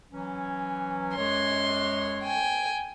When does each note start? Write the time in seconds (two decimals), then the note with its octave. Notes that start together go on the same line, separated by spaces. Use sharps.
0.11 E3 F#3 C#4
1.17 F#2 G#3 C#5 C6
2.23 G5 G#5